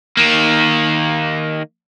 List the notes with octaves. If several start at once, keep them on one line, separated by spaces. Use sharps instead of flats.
D#3 A#3